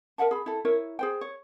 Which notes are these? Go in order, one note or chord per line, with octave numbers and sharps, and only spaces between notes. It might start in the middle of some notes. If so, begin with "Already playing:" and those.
A#4 E5 F#5 A5
G#4 B5
E4 A4
E4 A#4 C#5 E5
G#4 C5 G5
C#5